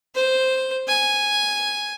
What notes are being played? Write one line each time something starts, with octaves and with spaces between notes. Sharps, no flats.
C5
G#5